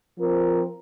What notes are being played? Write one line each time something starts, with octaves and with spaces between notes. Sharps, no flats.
F3 C4 F4 A#4